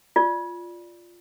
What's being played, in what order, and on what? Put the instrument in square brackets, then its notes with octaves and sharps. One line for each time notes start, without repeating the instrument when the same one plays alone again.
[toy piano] F4 D5